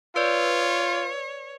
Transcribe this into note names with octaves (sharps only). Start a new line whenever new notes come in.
F4 B4 C#5 D5